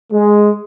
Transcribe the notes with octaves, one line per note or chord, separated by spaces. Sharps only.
G#3